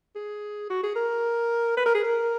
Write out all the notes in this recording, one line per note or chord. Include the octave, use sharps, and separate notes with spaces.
G#4
F#4
G#4
A#4
B4
A#4
G#4
A#4